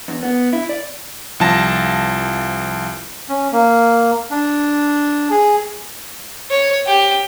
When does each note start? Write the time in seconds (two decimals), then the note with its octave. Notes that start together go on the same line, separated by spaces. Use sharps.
0.08 E2
0.23 B3
0.53 E4
0.69 D5
1.40 C2 F3 A5 A#6
3.28 C#4
3.52 A#3
4.31 D4
5.30 G#4
6.51 C#5
6.87 G4